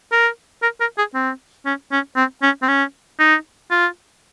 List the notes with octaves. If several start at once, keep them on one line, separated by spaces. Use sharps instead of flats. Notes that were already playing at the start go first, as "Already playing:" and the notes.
A#4
A#4
A#4
G#4
C4
C#4
C#4
C4
C#4
C4
C#4
D#4
F4